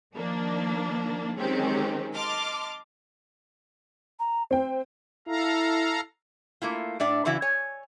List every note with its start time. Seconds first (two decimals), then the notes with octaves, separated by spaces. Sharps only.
0.15 D#3 F3 A#3 D4
1.38 D#3 F#3 G#3 C4 C#4 G4
2.15 D#5 A5 C6 D6 F6
4.19 A#5
4.51 C4 C5 G5
5.27 E4 A4 F5 A#5
6.62 A3 A#3 E4 F4
7.00 A2 D4 D5 E5
7.25 C#3 E3 C#4 E4 F#4
7.42 C#5 G#5